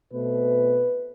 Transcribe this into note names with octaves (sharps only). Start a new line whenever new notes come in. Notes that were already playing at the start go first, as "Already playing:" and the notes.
B2 A3 C4 B4